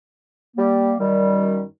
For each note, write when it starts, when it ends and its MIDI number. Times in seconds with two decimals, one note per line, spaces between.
0.57 0.93 55
0.57 0.93 58
0.99 1.62 42
0.99 1.62 51
0.99 1.62 55